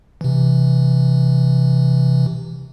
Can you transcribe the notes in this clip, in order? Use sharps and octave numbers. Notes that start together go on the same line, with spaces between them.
C3 E3